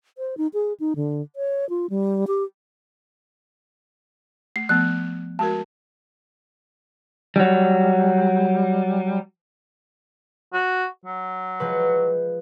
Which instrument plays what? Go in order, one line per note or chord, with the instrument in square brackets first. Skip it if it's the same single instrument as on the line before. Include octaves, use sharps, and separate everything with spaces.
[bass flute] C5
D#4
G#4
D#4
D3
C#5
F4
G3
G4
[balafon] A3 [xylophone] C7
[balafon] F3 A3 B3 [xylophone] F#6
[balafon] G#3 F#4 A#4 [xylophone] A5
[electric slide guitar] F#3 G3
[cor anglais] F#4
F#3
[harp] F3 G#3 B4